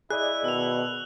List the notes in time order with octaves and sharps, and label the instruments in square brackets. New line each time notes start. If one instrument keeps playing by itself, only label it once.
[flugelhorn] E4 [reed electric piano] G#4 D5 D#5 [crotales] F#6
[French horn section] B2 D#3 [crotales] E6 F7